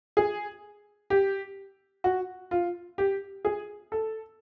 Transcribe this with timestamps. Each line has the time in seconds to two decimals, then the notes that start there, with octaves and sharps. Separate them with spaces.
0.17 G#4
1.10 G4
2.04 F#4
2.51 F4
2.98 G4
3.45 G#4
3.92 A4